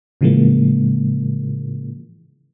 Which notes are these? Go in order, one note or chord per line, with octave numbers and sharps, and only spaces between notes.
A2 C#3 E3 F3 G#3 A#3